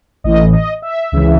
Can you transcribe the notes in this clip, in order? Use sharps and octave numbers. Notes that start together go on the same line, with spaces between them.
A1 A2 E3 D#5
D#5
E5
C#2 C#3 E3